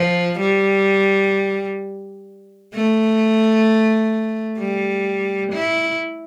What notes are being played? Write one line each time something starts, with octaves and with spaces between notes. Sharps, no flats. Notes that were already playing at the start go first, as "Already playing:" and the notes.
Already playing: F3
G3
A3
G3
E4